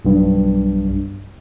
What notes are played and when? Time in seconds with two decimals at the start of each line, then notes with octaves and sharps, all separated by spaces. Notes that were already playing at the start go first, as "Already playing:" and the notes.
0.05 B1 G2